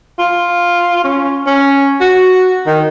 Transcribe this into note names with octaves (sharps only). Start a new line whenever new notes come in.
F4
C#4
C#4
F#4
D#3